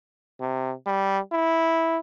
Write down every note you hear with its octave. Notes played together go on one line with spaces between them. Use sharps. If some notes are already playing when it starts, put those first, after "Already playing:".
C3
G3
E4